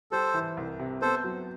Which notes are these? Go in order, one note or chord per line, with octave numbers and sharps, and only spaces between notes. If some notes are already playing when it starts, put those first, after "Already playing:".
G3 A4 C5
E3
C2
C3
B3 A4 C5
F#3